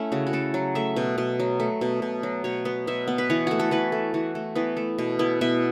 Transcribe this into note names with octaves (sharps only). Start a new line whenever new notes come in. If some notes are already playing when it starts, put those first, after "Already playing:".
Already playing: A3 C#4 E4
C#3 F#4
F#4
C#3 A4
F#3
A3 E5
B2
B2
F#3
A3
B2
B2
F#3
B2 C#5
B3
B2 E5
B3
B4
E3 C#5
A3 F#4
A4
E3 B4
A3
E3 F#4
A3
E3 B3
A3
B2
B3 E4
B2 E5